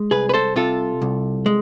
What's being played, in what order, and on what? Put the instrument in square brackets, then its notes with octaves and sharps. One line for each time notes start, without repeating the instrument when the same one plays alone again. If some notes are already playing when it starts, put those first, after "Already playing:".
Already playing: [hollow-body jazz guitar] G#3
C2 G#4 B4
B4
A4 C5
C3 F4 A4
C2
G#3